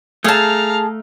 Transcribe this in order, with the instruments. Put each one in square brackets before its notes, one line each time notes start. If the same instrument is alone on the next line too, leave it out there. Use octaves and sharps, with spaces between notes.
[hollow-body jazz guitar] A3 [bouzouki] G#4 A5 [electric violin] F5 A#5